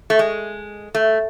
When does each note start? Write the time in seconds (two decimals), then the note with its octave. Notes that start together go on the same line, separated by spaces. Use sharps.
0.10 A3
0.19 G#3
0.95 A3